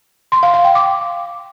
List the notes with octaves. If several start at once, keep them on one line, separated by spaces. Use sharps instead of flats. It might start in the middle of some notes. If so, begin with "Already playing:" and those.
C6
F5
F5
G5
D6